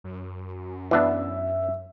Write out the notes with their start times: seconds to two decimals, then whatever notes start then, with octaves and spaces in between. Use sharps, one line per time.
0.04 F#2
0.91 E3 B3 D4 E5